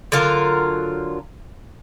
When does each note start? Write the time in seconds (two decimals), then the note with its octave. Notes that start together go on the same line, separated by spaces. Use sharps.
0.12 D3 F#3 F4 A#4